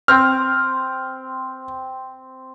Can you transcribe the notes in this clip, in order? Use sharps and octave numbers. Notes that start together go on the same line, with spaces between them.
C4 F6